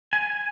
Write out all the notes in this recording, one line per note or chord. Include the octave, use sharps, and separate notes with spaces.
G#5